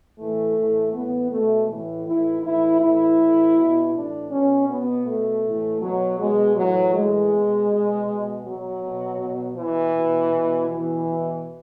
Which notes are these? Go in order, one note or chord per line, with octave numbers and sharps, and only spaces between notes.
A2 E3 A3
A2 E3
A2 E3 B3
B2 A3
A2 E3
A2 E3 E4
A2 E3 E4
A2 E3 E4
A2 E3
B2
A2 E3 D4
B2 C#4
B2 B3
B2 A3
A2 E3
B2 F#3
B2 G#3
A2 E3 F#3
A2 E3 G#3
B2
B2
B2
B2 F#3
B2
B2
B2 E3
B2
B2
B2 E3
B2